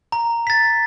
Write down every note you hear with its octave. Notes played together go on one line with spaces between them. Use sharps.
A#5
A6 B6